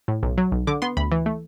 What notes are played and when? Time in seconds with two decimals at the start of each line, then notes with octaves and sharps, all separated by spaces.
0.08 A2
0.23 B1
0.38 F#3
0.52 B1
0.67 D3 D6
0.82 B3 C6
0.97 D2 B5
1.12 E3
1.26 A3